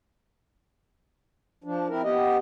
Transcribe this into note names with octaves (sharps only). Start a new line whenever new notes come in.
F3 D4
C4 E4 A#4
B3 G4 D#5